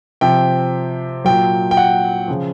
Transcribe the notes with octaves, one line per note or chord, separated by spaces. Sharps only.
C3 F3 G5
A#2 F#3 G5
G5
F#5
C#3 F3